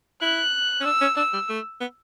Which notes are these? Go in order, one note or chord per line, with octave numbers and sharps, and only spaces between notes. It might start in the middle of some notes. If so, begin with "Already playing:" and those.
E4 F#6
C#4
D4 E6
C#4
D4 E6
G3
A3
B3